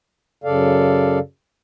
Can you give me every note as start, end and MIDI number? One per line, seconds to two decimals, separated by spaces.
0.44 1.19 42
0.44 1.19 49
0.44 1.19 69
0.44 1.19 74
0.44 1.19 77